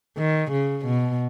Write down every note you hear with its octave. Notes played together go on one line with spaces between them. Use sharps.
D#3
C#3
B2